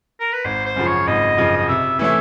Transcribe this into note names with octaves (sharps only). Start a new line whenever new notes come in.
A#4
B4
G#1 C5
C5
F#2 C#3 F3
C#5
G#1 D#5
F#2 C#3 F3
D#5
C3 E5
E3 A3 C#4 E4 E5